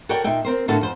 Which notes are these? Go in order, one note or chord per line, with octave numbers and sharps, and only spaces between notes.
F#4 A4 A#4 C#5 D5 G5
A#2 D#4 E5 G5
C4 A#4 C5
A2 D3 A#3 F#4 A4 A5
F2 C5